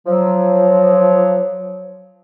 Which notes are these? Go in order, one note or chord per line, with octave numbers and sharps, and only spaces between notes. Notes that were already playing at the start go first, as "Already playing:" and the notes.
F3 F#3